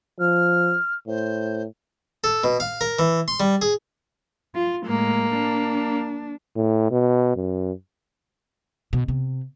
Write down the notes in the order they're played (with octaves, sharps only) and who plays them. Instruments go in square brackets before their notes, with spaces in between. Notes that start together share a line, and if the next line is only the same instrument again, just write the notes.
[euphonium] F3 [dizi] F6
[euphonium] A2 [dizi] C5
[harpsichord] A4
B2
F5
A#4
E3
C6
G3
G#4
[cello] F4
[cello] A2 G#3 [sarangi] A#3
[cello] D4
[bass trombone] A2
B2
F#2
[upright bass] B2
C3